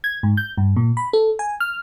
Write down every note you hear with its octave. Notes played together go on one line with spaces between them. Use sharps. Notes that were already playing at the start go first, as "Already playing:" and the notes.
G#6
G#2
G6
G2
A#2
B5
A4
G#5
F6